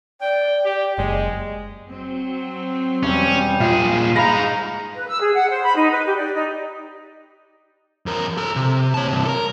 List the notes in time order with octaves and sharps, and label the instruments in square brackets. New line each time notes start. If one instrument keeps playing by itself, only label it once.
[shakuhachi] D5 [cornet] G5
[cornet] G4
[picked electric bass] F#1 [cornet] G#3 [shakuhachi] D#5
[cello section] F#3 C4
[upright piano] E1 [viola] G3 G5 [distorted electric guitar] C#4
[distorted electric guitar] A#2 G#4 [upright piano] F4
[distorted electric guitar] G#3 A#5 [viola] D#4 [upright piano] F5 B5 A#6
[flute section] B4
E6
G#4
F#5
C5
B5
D#4
B4
G4
D5
D#4
[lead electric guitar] F2 A#4
A4 A#5
C3
C#5 A5
G2 C3
A4 A#4